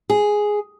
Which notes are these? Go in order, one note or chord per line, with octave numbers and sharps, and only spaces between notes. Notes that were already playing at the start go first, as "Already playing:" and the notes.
G#4